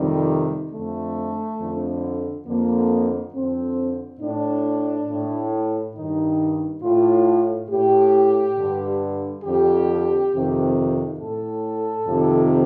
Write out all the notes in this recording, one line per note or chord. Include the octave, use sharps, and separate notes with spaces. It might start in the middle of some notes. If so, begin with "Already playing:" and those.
Already playing: F2 C3 D#3 G3
F2 D3 A3
F2 D3
F2 D3 A#3
F2 D3 C4
A2 D4
A2
G2 D#3 D#4
A2 F4
A2 G4
G2 D3
F2 D3 G4
F2 C3 D#3
A2 A4
F2 C3 D#3